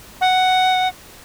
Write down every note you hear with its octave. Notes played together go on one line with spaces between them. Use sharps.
F#5